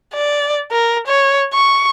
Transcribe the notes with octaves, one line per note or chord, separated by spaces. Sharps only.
D5
A#4
C#5
C#6